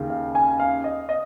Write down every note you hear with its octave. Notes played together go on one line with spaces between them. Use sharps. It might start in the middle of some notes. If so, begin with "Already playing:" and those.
Already playing: D#2 C#3
F5
G#5
F5
D#5
D#5